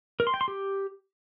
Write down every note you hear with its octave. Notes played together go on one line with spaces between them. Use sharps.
A#4
C6
G5
C6
G4